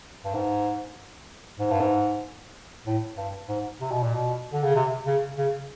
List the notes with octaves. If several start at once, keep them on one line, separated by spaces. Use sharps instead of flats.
G2
G#2
G#2
G2
G#2
A2
G2
G#2
C3
B2
A#2
B2
D3
C#3
C3
C#3
C#3